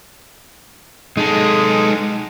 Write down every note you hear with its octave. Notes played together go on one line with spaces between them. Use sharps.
G#3 D#4 A4